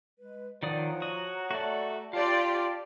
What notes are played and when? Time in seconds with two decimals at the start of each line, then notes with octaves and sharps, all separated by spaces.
0.19 G#3 B4
0.63 D#3 F3 C#5 D5 F#5 A#5 D#6
1.02 F#4 D#6
1.51 A3 F#4 D5
2.13 F4 G4 D5 F5 A5 C6